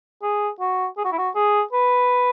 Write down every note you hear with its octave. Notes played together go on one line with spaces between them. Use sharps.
G#4
F#4
G#4
F#4
E4
F#4
G#4
B4